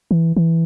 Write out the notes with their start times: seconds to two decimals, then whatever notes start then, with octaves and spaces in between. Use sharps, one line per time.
0.11 E3
0.37 E3